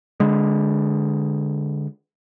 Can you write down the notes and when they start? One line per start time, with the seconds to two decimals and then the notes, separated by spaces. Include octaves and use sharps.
0.20 D3 G#3